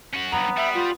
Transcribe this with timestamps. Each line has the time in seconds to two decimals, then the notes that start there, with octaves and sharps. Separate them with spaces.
0.14 C#4 F#4
0.32 G2 F#3 B3 A#5
0.57 G3 E5
0.75 F4